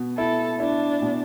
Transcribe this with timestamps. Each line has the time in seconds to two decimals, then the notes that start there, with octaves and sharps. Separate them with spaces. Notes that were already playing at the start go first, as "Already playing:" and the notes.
Already playing: B2
0.18 E4 A4
0.60 D4 E4
1.02 B2